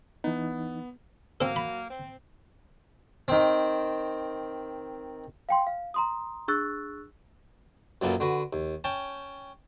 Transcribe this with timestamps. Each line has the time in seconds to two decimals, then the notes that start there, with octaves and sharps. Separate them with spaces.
0.24 E3 B3 D#4
1.41 F#3 A#3 C4 A4
1.56 B5
1.90 C4
3.28 D#3 C4
5.49 F5 G5 C6
5.67 F5
5.94 A#5 C6 D#6
6.48 D4 G#4 C#6 E6 F#6 A6
8.02 F#2 A#2 A#3 B3 A4
8.20 D3 F#4 B4
8.53 D#2
8.84 C#4 G5 A5